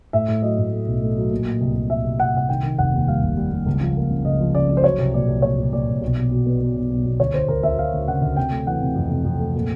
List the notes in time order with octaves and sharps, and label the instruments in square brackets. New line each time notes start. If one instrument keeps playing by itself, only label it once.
[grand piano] A2 E5
A2
F#3 D#5
A2
A3
B1
A3
F#3
A#2
A#2
C2
C2
A#2 E5
C2
C2 F#5
C2 F#5
D#3 G5
D#3
F1 F#5
D#2
G3 F5
F1
G3
G3
C#2
F3
A#3
C#3
C#2 D#5
F3
C#3 D5
F3
C5
F#3 C#5
C2
A#2 D5
C2
A#2 C#5
A#2
A#2 D5
C2
B1
B2
B2
B3
B3
B1
B1
B2
D2 C#5
D2 C5
D2 A#4
D2 E5
D2 F5
D2
C#3 F#5
D2
C3 G5
A3
E3 F#5
C3
F2
C3
F2
A3
A#2